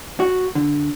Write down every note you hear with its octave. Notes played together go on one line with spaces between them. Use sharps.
F#4
D3